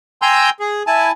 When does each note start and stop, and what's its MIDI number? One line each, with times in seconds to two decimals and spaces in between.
0.22 0.50 79
0.22 0.50 80
0.22 0.50 82
0.22 0.50 84
0.22 0.50 88
0.22 0.50 91
0.60 0.83 68
0.87 1.11 64
0.87 1.11 80
0.87 1.11 81